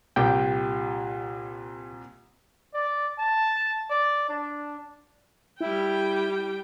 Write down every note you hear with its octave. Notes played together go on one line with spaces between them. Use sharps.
C2 A#2 G4 G5
D5
A5
D5
D4
G3 E4 G5